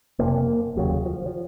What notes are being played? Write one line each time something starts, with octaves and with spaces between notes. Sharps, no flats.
F#1 F2 C3 A#3
F1 D#2 C#3 F#3
F3
F3